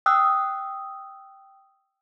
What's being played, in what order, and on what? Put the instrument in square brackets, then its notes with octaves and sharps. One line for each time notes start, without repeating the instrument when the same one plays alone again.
[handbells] G5 D#6 E6 F#6